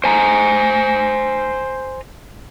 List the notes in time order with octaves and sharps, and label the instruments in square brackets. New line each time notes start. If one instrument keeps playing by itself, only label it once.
[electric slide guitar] C5 G#5 A#5